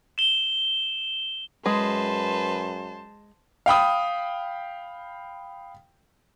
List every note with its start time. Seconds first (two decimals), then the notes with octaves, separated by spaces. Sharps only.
0.18 E7 G7
1.66 F#2 G#3 B4 C5 A5
3.66 F5 G5 B5 D#6